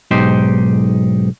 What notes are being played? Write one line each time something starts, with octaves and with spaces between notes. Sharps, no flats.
B1 G#2 D#4 G4 C5